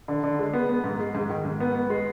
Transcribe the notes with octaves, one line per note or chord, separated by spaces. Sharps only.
D3
D3
G#3
B3
B3
G#2
G#3
G#2
D#3
G#2
B3
B3
G#3